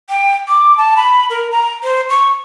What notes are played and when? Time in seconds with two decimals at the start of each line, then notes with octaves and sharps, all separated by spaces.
0.10 G5
0.48 D6
0.77 A5
0.97 B5
1.30 A#4
1.51 A#5
1.83 C5
2.10 C#6